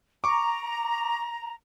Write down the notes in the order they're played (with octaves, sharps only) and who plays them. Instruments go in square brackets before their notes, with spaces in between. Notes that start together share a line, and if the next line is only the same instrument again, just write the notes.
[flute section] A#5 [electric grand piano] C#6 D6